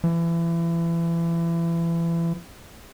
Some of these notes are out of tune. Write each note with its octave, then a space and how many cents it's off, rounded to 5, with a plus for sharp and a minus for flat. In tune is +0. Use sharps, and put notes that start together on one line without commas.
E3 +30